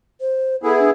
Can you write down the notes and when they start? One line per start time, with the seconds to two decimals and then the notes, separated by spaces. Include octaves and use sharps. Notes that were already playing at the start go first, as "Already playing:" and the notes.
0.21 C5
0.63 B3 E4 G#4 A4
0.79 D4